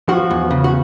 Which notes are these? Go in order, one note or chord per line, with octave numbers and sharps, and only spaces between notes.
F3 F#4
E2
C#3
F#4